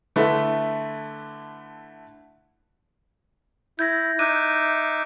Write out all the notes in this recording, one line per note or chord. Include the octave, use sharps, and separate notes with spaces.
D3 A3 E4 B4
E4 G6 G#6 A#6
D#4 E5 D6 F#6 D#7